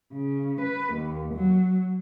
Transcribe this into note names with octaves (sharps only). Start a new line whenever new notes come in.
C#3
B4
D#2
F#3